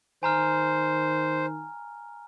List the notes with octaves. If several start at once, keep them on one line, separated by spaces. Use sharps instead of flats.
D#3 C5 G#5 A#5 F6